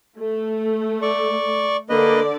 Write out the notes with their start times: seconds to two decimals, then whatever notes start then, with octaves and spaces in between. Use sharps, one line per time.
0.17 A3
1.02 D5 C#6
1.90 D3 A#3 B4 D5 D#5